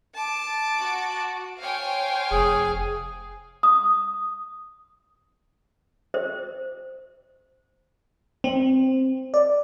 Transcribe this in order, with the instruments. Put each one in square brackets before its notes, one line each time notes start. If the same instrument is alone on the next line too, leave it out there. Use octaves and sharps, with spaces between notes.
[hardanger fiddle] A5 D6
[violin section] F#4
[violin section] C5 C#5 G5 [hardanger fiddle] F5 G#5
[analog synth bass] F1 [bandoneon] G#4
[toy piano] D#6
C5
[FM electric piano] C4
D5